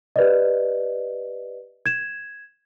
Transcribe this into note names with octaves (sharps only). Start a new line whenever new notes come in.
G4 B4 D5 D#5
G#6 E7